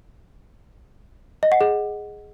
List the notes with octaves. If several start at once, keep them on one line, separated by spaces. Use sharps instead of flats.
D#5
F#5
G#4